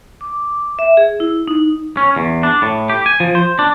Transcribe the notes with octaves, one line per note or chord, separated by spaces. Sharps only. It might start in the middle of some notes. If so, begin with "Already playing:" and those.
D6
E5
G#4
E4
D#4
C#4
E2
D4
A2
G4
G#5
F3
C5
D4